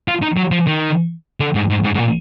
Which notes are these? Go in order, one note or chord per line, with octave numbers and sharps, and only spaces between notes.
F4
D#4
F#3
F3
D#3
D3
G#2
G#2
G#2
G#2
A#2